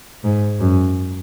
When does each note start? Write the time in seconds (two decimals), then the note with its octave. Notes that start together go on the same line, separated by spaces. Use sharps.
0.24 G#2
0.60 F#2